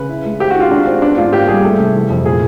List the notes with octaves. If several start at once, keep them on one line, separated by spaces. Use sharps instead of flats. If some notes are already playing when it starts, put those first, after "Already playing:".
Already playing: C#3 B4
E4
G#3
C4 G4
F#4
D#4 F4
G#3 D4
C4
B3 D4
G#2 F4
A#3 G4
G3 G#4
A3 A4
C3
E3
F2
A#2 G#4